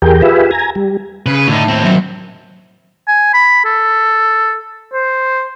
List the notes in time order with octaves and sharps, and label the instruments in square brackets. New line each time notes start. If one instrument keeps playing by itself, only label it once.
[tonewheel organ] E2 G4 G#4 A#4 G5
F4 G4 G#4 B4 E5
G#5 A#5
G3
[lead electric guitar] C#3 [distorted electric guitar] B4
[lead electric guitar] A2 [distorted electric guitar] D3 D#4
[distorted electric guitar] D#2 C4
[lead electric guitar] F#3 E5
[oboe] G#5
B5
A4
C5